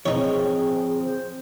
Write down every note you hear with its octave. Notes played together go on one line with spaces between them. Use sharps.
F3 C4 D#4 G#4 C#5
C5